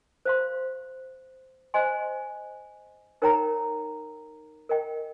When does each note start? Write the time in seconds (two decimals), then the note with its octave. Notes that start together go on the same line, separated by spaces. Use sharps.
0.25 C5 F5 C6
1.74 C5 D#5 G#5 C6
3.22 D#4 A#4 C#5 G5 A#5
4.69 A#4 D#5 G5